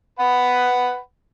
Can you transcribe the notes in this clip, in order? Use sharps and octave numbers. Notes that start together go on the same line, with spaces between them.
B4 F#5 B5